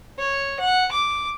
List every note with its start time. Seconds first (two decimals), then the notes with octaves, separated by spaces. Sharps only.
0.19 C#5
0.60 F#5
0.92 D6